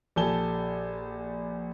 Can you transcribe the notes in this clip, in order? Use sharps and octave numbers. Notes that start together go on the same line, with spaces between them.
A#1 G4 A4 G#5 A5 G7